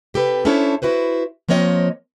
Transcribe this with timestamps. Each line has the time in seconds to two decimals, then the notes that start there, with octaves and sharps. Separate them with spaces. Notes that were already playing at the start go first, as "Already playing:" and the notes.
0.14 C3 G4 A4 B4
0.45 C#4 D4 E4 A4 C5 C#5
0.82 E4 F#4 B4 C5
1.49 F3 A#3 C4 C#5 D#5